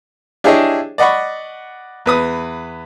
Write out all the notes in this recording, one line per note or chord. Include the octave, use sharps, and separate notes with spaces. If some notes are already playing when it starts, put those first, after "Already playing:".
D4 E4 G4 G#4 C#5 D#5
D5 D#5 F#5 B5 C#6
E2 B4 D#6